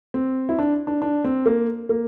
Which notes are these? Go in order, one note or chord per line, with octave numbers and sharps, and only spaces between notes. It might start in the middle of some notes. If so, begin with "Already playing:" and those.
C4
E4
D4
D4
D4
C4
A#3
A#3